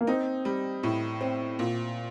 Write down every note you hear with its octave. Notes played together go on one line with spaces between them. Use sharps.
A#3
C4 D#4
G3
A2
C4
A#2